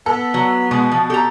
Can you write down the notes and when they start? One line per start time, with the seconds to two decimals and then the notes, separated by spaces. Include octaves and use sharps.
0.06 B3 A4
0.34 F#3
0.71 B2 G#3
0.92 F3
1.10 G4 A4 A#5